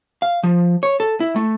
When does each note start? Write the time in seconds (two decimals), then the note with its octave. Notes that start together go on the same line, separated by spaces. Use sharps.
0.22 F5
0.43 F3
0.83 C#5
1.00 A4
1.20 E4
1.36 A3